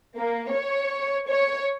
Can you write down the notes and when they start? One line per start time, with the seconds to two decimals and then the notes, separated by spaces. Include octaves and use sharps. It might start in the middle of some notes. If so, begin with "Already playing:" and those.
0.18 A#3
0.53 C#5
1.29 C#5